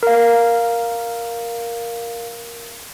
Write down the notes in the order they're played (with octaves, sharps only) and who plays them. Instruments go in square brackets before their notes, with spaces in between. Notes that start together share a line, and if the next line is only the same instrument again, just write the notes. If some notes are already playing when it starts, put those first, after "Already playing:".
[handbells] A#4 F5